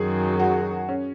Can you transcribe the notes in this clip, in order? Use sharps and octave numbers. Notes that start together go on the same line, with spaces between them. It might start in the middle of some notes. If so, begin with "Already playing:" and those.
Already playing: F#2 D#3 F#3 G#4
F#4
C#4